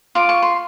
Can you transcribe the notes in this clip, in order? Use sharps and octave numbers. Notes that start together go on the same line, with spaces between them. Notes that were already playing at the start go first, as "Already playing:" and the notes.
F4 D6
C#6
C6